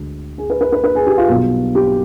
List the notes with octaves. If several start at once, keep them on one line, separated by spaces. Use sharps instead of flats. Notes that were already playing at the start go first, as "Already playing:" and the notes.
Already playing: D2 D3 G#3
G#4
B4
B4
B4
B4
G#4
G4
F4
B1 B2 G3
G4